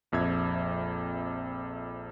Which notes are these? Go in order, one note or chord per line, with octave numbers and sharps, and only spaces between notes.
A#1 F2 E5 G#6